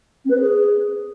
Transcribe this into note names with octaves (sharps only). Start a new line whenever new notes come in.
C4
B4
C5
G#4